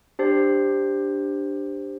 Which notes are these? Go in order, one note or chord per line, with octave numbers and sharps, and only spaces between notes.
D4 G4 C5